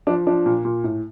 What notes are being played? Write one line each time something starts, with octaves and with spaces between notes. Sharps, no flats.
F3 D4
F3 D4
A#2
A#2
A2